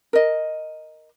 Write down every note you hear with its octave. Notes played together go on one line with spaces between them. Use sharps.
A#4 D#5